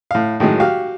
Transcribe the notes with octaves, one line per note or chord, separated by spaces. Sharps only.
A2 F5
A2 D#3 F#3 G#3
F#4 G4 F5